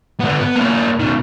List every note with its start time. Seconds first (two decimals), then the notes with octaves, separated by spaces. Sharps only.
0.20 D3 B3
0.39 B3
0.56 A#3 E4
0.99 B2 D#3